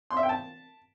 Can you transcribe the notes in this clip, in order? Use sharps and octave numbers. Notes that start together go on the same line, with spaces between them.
C6
E5
G5
A5